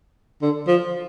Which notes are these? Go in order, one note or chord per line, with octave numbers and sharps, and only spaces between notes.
D3
F3